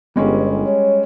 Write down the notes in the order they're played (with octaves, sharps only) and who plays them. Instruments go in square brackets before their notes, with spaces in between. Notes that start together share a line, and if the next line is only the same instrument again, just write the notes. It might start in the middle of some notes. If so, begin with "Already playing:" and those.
[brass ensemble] G1 [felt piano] G3 G#3 C#4
[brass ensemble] C#5